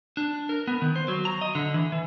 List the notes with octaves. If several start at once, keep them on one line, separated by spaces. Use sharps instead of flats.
D4
A#4
B3
D#3
C5
F#3
A#5
D#5
D3
E3
E3